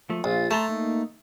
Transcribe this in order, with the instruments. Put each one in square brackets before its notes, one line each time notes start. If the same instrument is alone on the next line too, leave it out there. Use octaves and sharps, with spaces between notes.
[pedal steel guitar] F3 A3
[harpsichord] A#1 [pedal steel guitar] F4
[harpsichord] A3 [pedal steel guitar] A5 A#5 C6
[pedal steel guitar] A#3 D#4